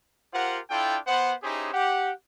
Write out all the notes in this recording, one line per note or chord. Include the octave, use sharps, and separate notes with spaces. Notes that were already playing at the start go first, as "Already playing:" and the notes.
F4 G4 A#4 C5 F#5
D4 E4 F4 A4 G5
B3 C5 F#5
C#4 D#4 E4 G4 G#4 C5
G4 F#5